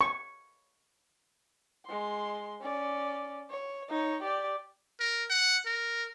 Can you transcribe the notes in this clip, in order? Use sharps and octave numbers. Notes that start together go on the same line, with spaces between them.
C#6
G#3 C6
C#4 D5
C#5
D#4 C#5
G4 D5
A#4
F#5
A#4